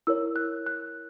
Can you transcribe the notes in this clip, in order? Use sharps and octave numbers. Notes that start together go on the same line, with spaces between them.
E4 A#4 C#5 E6
F#6
F#6